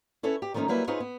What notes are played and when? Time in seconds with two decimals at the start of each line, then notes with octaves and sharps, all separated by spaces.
0.23 C#4 E4 A4 B4 C#5
0.42 G4
0.54 D#3 F3 A3 A#3 C#4 D#4
0.68 F#3 G3 A#3 E4 B4
0.87 C4 D#4 F4 G#4 B4 C#5
1.00 B3